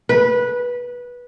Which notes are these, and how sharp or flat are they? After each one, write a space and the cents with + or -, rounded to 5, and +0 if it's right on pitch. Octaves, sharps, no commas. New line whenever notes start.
B4 -15